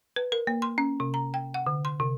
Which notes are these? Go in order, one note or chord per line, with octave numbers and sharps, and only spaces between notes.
B4
A#4
A#3
C6
C#4
C3
A#5
G5
F#5
D3
C6
C3